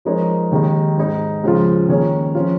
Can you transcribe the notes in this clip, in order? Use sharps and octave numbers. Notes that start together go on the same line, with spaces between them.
F3 G#3 D#4 A#4 C#5
D#2 D#3 G#3 D#4
G#2 G#3 D#4 G#4
C#2 C#3 F3 G#3 F4
D#3 A#3 C#4 G#4 C#5
F3 C#4 F4